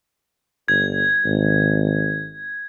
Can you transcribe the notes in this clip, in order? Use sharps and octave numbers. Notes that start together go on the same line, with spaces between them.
G1 G#6
G#1